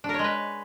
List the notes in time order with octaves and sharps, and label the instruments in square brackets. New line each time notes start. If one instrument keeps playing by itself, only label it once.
[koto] D4
A#4
C#5
G#3
B4